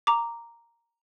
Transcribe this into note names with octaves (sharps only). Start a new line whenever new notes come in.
A#5 D6